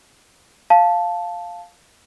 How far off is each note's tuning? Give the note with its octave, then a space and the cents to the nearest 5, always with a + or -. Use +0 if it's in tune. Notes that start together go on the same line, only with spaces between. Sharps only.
F5 +0 A5 -5